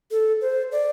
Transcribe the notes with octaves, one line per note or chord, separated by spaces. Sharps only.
A4
C5
D5